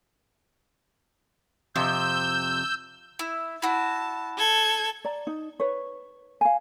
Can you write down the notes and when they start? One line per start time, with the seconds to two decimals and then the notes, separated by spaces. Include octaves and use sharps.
1.76 F2 C3 E6 G6
3.19 E4
3.62 E4 F#4 A5
4.37 A4 G#6
5.05 D5 A#5
5.27 D#4
5.60 B4 C#5
6.41 F5 G#5